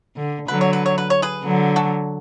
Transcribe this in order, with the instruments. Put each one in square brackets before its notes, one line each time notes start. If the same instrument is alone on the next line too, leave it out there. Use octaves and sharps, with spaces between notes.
[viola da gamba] D3
[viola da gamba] D3 F#3 [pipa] B4
[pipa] C#5
B4
C#5
B4
C#5
G#4 B4
[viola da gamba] D3 F#3
[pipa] F#4 A4